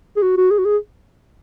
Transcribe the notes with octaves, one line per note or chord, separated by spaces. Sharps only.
G#4
F#4
F#4
G#4
F#4
G#4